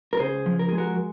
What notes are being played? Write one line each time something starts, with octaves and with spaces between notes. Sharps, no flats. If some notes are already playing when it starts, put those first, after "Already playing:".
A#4
C#2 G#4 C5
F3
A#4
G#3 G#4
F#4 A#4